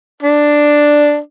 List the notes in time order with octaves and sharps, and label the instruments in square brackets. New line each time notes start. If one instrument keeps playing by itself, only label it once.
[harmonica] D4